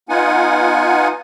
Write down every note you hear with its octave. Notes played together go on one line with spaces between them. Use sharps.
B3 D#4 F4 F#5 G#5